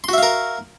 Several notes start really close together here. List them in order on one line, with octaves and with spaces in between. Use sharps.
C6 F#4 E5 F5 A#4